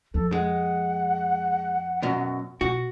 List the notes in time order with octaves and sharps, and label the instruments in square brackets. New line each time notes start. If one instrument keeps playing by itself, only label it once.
[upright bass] F2 [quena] A4
[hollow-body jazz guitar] G#3 [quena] F#5
[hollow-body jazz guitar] F#2 B2 F#3
[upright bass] B2 [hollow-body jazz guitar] F#4